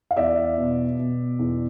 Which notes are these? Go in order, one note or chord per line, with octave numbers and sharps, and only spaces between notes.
F5
E2 D5 E5
B2
B2
E2